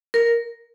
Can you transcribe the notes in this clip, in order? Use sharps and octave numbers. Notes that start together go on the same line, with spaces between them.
A#4